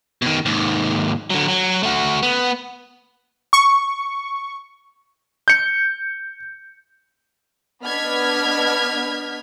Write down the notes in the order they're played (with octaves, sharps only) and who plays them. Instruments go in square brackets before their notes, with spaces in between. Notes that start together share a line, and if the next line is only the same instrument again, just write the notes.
[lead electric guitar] B2 D#3
D#2 G#2
D3 F#3
F#3
A3 F#4
B3
[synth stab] C#6
[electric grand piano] G6 C#7
[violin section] B3 D4 D#5 F6 G#6 B6